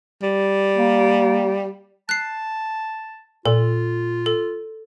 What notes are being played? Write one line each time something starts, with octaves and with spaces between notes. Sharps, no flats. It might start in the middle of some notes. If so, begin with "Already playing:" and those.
G3
A#3
A5 F#6 C7
A#2 F4 A4
A4